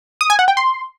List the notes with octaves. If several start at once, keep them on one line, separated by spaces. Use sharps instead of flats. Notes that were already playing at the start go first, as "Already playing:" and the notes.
D#6
G#5
F#5
G5
C6